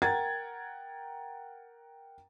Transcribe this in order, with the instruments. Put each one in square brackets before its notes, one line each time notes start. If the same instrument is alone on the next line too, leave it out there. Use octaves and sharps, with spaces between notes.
[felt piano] A#4 F#5 G5 A#5 G#6 A6